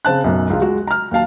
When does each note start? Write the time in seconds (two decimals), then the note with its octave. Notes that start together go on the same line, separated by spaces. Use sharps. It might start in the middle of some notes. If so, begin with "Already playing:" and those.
0.05 C#3 C4 A5 F#6
0.24 B1 F#2
0.50 C#2 F4
0.61 G#3 F#4
0.87 A#5 F6
1.11 D#2 F#3 F5 A5